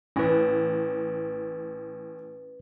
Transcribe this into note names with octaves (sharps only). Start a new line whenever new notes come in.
A1 C#4 B4